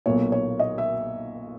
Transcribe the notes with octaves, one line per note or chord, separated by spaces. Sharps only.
B1 A#2 A#3 C#5
C#5
D#5
E5